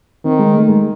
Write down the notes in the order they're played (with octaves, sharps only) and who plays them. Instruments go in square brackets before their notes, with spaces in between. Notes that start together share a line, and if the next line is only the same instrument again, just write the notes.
[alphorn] D#3 [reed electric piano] C4
[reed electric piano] G#3
A3
G#3